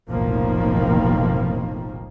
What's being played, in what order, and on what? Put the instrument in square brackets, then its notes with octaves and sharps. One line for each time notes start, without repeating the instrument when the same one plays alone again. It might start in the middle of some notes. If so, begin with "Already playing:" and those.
[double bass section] F1 B1 A2 D#3 F3 A#3